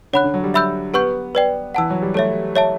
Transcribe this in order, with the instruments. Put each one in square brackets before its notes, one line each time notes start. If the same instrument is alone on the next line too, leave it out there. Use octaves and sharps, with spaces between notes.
[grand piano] D3 [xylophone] C#5 F#5 B5 F#6
[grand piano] D3
F#3
G3
[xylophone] E5 B5 E6 G6
[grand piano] B3 [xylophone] G4 B4 F#5 C#6 G6
[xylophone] B4 D5 G5
[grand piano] E3 [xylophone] F#5 A5 E6
[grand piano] F#3
G3
[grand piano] A3 [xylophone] G4 C#5 E5
[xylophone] C#5 E5 A5